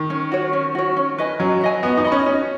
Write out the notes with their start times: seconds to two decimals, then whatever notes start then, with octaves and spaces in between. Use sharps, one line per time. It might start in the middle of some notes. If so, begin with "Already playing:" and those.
Already playing: D#3
0.10 C#4
0.32 F#4 C#5
0.53 C#4
0.75 F#4 C#5
0.96 C#4
1.18 B4 D#5 G#5
1.40 F#3 C#4
1.61 B4 D#5 G#5
1.83 B3 F#4
1.97 D#4
2.04 D#5 B5
2.12 C#4
2.26 C#4 F#4